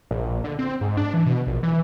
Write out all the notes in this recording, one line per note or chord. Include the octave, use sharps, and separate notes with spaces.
A#1
D3
C4
G#2
D4
E3
B2
A#1
E3